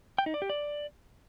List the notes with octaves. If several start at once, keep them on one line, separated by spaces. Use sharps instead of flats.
G5
D#4
D5
G4
D5